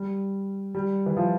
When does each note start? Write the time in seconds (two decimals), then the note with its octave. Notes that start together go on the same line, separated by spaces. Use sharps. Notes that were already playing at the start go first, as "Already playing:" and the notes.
Already playing: G3
0.75 G3
1.06 E3
1.17 F3